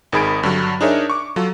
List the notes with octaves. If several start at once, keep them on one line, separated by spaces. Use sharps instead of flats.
G#1 D#3 G#4 B5 G#6 D7
G2 D3 F#3
D4 D#4 G#4 A#4 C#5 E5
C#6 D6
F#3 F4 A4